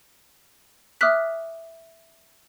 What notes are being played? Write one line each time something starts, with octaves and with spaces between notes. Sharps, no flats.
E5 D6 D#6 F6 F#6 B6